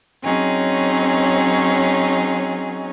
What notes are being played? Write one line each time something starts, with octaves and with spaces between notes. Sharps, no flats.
F#3 C4 C#4 D#4 G#4